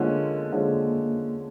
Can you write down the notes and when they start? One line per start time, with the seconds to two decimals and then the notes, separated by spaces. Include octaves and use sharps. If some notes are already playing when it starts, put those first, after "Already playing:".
Already playing: D3 F3 G#3 A#3 C#4
0.52 D3 F3 G#3 C#4